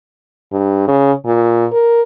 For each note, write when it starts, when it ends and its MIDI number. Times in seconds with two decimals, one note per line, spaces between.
0.52 0.86 43
0.88 1.12 49
1.26 1.66 46
1.72 2.02 70